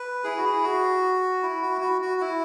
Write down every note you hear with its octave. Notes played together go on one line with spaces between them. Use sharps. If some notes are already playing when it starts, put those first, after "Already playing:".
Already playing: B4
E4 G#4
F#4
E4 G#4
F#4
E4
F#4
E4
F#4
F#4
E4